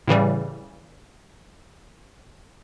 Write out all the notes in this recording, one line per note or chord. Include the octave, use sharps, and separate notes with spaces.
A2 C#3 E3 G3